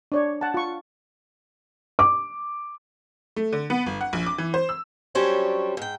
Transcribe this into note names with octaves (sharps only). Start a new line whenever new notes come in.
D4 C#5 D5
F#5 A5
F4 C#6
D6
A3
D3
B3
G1
F#5
A#1
D6
E3
C5
E6
F#3 G3 C#4 D4 C5 C#5
G#2 G5